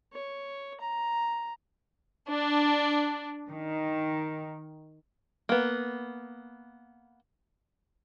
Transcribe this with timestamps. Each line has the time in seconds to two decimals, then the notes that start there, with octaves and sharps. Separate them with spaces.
0.13 C#5
0.80 A#5
2.28 D4
3.50 D#3
5.49 A#3 B3